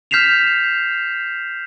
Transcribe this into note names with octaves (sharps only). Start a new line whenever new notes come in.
F6 G6 B6 C7 E7 F7